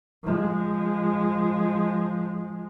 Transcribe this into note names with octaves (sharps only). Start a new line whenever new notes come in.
F3 G#3